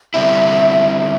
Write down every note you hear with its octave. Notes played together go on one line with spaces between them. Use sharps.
D3 G3 C4 E4 E5
E5